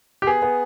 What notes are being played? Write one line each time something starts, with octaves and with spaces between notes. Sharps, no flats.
G4
B3 G#4
B3